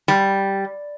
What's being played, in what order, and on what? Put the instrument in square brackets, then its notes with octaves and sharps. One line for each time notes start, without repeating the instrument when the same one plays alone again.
[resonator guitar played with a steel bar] G3